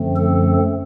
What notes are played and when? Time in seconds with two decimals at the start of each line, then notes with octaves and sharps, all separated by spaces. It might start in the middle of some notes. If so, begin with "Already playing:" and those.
Already playing: F#2 D3 F3 A3 C4
0.16 A4